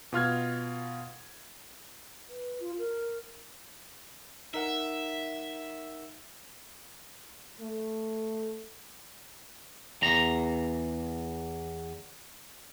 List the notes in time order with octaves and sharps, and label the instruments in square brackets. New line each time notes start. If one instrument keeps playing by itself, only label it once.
[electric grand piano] B2 F4 F6 G#6
[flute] B4
F4
A#4
[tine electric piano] D#4 A#4 F#5 [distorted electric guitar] E5
[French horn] A3
[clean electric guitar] E2 A#5